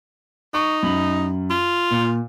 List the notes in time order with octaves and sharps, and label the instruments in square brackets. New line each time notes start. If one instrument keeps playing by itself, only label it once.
[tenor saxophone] D#4 [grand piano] C#6
[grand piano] F#2 B5 F#7
[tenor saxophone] F4
[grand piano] A#2